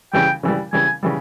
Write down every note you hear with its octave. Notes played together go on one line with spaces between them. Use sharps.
C#3 E3 G3 G5
C#3 E3 G3
C#3 E3 G3 G#5
C#3 E3 G3